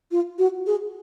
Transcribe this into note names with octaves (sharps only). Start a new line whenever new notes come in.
F4
F#4
G#4